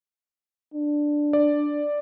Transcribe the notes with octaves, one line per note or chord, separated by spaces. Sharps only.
D4
D5